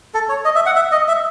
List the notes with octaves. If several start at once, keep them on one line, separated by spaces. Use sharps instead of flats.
A4
C#5
D#5
E5
F#5
E5
D#5
E5